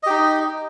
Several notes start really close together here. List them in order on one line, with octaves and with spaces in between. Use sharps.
D#5 G4 D#4